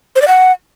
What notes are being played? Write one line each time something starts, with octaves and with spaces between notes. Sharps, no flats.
C5
D5
F#5